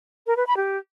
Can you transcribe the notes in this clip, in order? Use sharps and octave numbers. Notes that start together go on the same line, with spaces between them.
A#4
B4
B5
G4